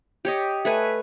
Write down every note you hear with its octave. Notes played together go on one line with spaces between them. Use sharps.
G4 C#5 D#5
A3 B4 G#5